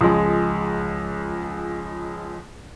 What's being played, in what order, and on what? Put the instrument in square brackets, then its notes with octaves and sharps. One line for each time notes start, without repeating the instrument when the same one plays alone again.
[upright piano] C#2 F3 G#3